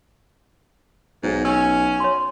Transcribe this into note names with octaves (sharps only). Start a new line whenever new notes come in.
B1 G#2
C#4 E6
C#5 C6